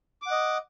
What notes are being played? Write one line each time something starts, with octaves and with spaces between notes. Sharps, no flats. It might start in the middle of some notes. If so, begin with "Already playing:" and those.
D#5 F#5 D6